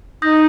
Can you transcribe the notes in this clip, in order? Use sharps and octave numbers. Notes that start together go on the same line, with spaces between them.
D#4 D#6 G6 A#6